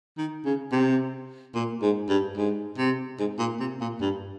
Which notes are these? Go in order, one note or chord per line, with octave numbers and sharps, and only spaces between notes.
D#3
C#3
C3
A#2
G#2
G2
G#2
C3
G#2
A#2
C3
A#2
G2